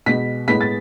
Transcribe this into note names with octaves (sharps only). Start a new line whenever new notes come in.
B2 G#3 B3 B6
A2 G#3 B3 B6
A6